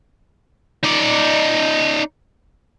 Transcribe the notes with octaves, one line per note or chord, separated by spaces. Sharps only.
D#4 D5